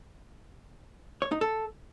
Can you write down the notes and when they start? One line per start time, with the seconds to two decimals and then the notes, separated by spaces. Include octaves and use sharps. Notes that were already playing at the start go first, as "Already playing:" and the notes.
1.22 C#5
1.32 D#4
1.41 A4